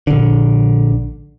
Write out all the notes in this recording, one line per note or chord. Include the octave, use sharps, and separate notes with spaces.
A#1 D3